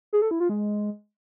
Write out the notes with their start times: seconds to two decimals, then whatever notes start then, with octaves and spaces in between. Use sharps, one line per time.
0.13 G#4
0.22 A4
0.31 E4
0.40 F4
0.49 G#3